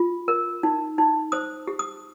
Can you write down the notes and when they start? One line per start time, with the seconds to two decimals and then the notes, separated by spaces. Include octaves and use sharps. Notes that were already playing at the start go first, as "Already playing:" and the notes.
Already playing: F4
0.28 A#4
0.63 D#4
0.98 D#4
1.32 C5 D#6
1.67 G4
1.79 D#6